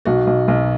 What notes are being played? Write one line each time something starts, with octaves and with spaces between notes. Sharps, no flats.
B1 F#4
B1
B1